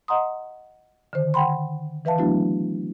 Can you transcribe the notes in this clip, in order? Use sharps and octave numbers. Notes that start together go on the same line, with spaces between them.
D#5 F#5 A#5 C6 D#6
D3 D#3 C5
F#5 G5 B5 C6
E3 B4 E5 F5 A5
F#3 A3 B3 D4 E4 F#4